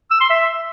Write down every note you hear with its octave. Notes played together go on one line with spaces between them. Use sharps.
E6
C6
E5